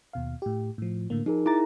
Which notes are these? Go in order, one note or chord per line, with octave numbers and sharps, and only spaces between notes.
D#2 B2 F5
A2 G4
A2 F3
A2 D3 A#3
F3 D#4 G#4 A#4
E4 G#4 A#5 D6 A6